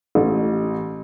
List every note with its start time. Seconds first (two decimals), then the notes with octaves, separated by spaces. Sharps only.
0.15 A1